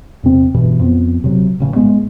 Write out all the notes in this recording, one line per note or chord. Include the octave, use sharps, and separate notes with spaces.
E2 C3 C4
A1 G2 B2 E3
F2 B3
D1 C3 F#3
A1 C#3
G#2 G#3 B3